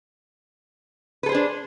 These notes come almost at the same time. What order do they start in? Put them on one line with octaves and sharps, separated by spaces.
B4 A4 C5 G#4 D4